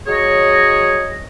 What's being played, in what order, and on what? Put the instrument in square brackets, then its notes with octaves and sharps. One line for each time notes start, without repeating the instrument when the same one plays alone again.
[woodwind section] F#3 G#4 C#5 D#5